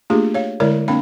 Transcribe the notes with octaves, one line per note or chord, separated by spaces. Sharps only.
A3 A#3 D4 F4 G4 G#4
C#5 F5
D3 G#3 E4 A#4 C#5 D5
A#3 C4 D4 F5 B5